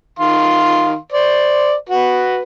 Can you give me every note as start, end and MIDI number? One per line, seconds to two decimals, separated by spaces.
0.19 0.97 51
0.19 0.97 77
0.19 0.97 84
1.12 1.74 72
1.12 1.74 74
1.89 2.42 66
1.89 2.42 71